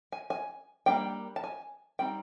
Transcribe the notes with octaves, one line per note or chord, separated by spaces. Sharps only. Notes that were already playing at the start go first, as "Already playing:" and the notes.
G#5
G#5
G3 A#3 D4 G5
A5
G#5
G3 C4 D#4 G5